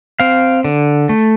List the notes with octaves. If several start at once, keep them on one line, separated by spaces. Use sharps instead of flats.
C4 F5
D3
A3